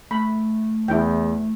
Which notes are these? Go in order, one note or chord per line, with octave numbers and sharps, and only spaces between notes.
A3 B5
E2 E4 G5